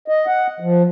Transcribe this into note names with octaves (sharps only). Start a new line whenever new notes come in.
D#5
F#5
F3